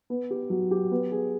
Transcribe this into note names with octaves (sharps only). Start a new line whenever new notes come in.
B3
G4
F#3
G4
B3
G#4